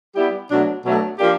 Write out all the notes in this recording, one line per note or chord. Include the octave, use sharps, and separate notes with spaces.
G3 B3 E4 G4
B2 F#3 A3 D4
B2 F#3 A3 D4
F3 A#3 D4 G4